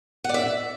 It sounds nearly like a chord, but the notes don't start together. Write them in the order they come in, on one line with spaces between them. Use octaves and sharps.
F#5 D5 E5